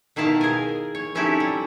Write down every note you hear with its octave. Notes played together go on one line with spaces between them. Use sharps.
B2 D#3 E4 F5 A5 A#5
G#4 A#4 G#5
C#5
C4 C#4 D#4 E4 G4 A4
G3